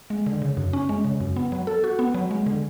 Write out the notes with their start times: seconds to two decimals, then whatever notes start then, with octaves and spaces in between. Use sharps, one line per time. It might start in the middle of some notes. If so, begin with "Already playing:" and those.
0.10 G#3
0.26 D3
0.42 C#3
0.57 F#2
0.73 C#4
0.89 G#3
1.04 C#3
1.20 F#2
1.36 B3
1.52 F#3
1.67 A4
1.84 F#4
1.99 B3
2.14 F#3
2.31 G#3
2.46 D3